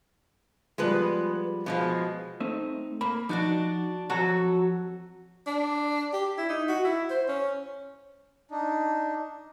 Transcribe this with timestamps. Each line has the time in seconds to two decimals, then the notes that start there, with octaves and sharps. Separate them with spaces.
0.78 F3 G3 G#3 B3 B4
1.66 B2 F3 G#3
2.40 A3 C4 D#4
3.01 A#3 B5
3.29 F3 D4 D#4 F#4 D5
4.10 F2 F#3 F#4 A4 A5 A#5
5.47 D4
6.13 G4
6.38 E4
6.49 D#4
6.68 F#4
6.84 E4
7.10 C5
7.28 C#4
8.51 D4 D#4